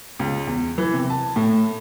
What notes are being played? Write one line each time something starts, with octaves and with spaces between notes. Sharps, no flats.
C#2
E2
E3
C3
A5
A2